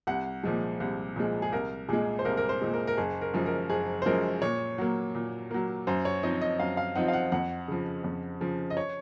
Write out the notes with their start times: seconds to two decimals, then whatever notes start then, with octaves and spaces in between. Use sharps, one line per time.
0.07 C2 F#5
0.43 A#2 F3 G#3
0.80 C2
1.16 A#2 F3 G#3
1.42 G#4
1.52 C2 A#4
1.89 A#2 G#3 G#4
2.19 C5
2.25 C2 A#4
2.37 A#4
2.49 C5
2.61 A#2 G#3
2.73 A#4
2.87 A#4
2.97 F#1 G#4
3.21 A#4
3.34 F#2 F3 G#3
3.46 A#4
3.70 F#1 G#4
4.02 C5
4.06 F#2 F3 G#3 A#4
4.42 A#2 C#5
4.78 F#3 A#3
5.15 A#2
5.51 F#3 A#3
5.87 F#2 C5
6.05 C#5
6.23 F3 C4 D#4 D#5
6.41 D#5
6.59 F#2 F5
6.77 F5
6.95 F3 C4 D#4 F#5
7.08 F5
7.13 F#5
7.32 F2 F#5
7.68 C#3 F3
8.04 F2
8.40 C#3 F3
8.70 D#5
8.77 C#5